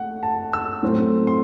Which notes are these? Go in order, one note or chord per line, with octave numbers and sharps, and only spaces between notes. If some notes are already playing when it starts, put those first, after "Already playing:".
Already playing: A3 F#5
A5
E6
A2 F#3 A3 C4
C6